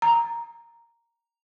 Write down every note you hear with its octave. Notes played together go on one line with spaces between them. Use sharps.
A#5